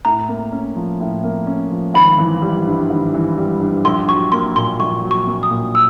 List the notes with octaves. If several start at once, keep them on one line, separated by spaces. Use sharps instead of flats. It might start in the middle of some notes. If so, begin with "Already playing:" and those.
A2 A#5
A#3
C#4
F3
A2
A#3
C#4
F3
G#1 B5
E3
G3
G2
G#1
E3
G3
G2
A#1 C6
F#3 C#6
A#3 C6
A#2 C6
A#1 C#6
F#3
C#6
A#3
D#6
A#2
E6